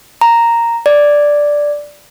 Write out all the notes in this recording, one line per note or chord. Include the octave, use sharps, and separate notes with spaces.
A#5
D5